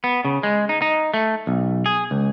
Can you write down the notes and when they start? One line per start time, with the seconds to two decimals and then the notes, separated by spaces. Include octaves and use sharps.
0.04 B3
0.25 C#3
0.43 G#3
0.69 D#4
0.82 D#4
1.14 A3
1.47 B1
1.86 G#4
2.11 C#2